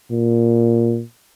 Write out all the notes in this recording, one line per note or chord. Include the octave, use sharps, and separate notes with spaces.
A#2